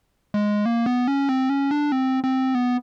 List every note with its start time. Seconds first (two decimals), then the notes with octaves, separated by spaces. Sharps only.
0.34 G#3
0.66 A#3
0.86 B3
1.08 C#4
1.29 C4
1.50 C#4
1.71 D4
1.92 C4
2.24 C4
2.55 B3